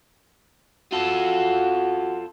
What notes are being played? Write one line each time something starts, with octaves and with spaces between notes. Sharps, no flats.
F4 F#4 A4